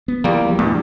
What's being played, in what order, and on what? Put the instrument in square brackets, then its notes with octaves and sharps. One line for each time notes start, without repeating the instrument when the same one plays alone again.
[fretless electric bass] B3
[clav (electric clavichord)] E2 G3 A#3 [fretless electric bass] F3
[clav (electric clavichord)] A#1 E2 G2 [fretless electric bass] A3 D4